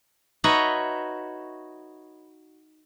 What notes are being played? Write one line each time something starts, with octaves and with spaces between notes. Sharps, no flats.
D#4 F#4 B4 C#5 D#5 E5